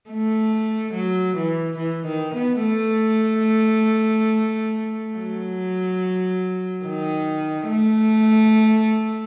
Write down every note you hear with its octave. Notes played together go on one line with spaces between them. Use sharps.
A3
F#3
E3
E3
D#3
B3
A3
F#3
D#3
A3